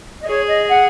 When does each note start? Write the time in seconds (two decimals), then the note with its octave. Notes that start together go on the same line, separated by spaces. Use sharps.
0.21 D#5
0.27 G#4 C#5
0.48 D#5
0.70 F#5